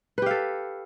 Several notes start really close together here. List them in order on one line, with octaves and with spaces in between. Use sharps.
B4 G4 F5 A4